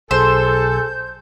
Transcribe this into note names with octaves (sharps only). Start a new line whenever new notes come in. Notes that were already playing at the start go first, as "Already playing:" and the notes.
B1 G#4 A4 C5 G6